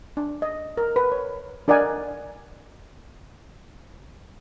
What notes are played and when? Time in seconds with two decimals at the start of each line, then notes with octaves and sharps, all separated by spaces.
0.17 D4
0.42 D#5
0.77 A#4
0.96 B4
1.12 C#5
1.68 D4 A#4 D5 D#5 F#5 G#5